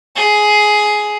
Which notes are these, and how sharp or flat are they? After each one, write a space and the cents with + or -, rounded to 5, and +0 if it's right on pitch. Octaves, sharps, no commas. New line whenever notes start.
G#4 +10